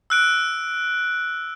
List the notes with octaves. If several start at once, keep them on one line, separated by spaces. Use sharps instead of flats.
E6 F#6 D7